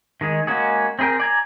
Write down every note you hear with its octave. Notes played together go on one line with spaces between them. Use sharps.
D#3 G#3 G#4
G#3 A#3 C#4 F#4 G#4
C4 E4 G#4 A#4 G5
D5 G#5 A#5